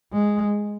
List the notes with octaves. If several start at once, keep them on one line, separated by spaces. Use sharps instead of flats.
G#3